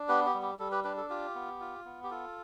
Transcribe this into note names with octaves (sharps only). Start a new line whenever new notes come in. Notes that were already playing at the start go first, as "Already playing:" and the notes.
Already playing: D4
B3 G4 B4
G4
G3
G4
G3 A4
G4 B4
D4 G4 B4
A4
F4 G4
B3
F4
B3
G4
F4 A4